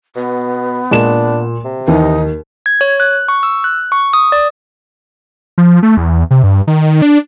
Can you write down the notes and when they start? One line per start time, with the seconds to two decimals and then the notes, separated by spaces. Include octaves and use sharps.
0.16 B2 B3
0.91 A#2 G#3 D4 E7
1.65 C3
1.88 D#2 E3 D#4
2.66 G#6
2.81 C#5
3.00 F#6
3.28 C#6
3.43 E6
3.64 F#6
3.92 C#6
4.13 D#6
4.32 D5
5.58 F3
5.83 A3
5.97 E2
6.31 C3
6.43 G2
6.67 D#3
7.02 D4